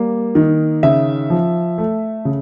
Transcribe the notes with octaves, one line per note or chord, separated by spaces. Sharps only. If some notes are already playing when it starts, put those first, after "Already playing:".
Already playing: G3 A#3
D#3
C#3 E5
F3
A3
C#3